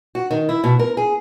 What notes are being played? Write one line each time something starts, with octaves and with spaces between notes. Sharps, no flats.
F#4
D#3
E4
B2
A#4
G#4